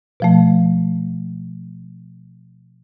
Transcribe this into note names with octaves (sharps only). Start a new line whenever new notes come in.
B2 F3 A3